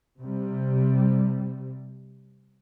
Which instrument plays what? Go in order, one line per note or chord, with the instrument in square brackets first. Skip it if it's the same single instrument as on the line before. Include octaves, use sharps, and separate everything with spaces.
[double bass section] C3 G3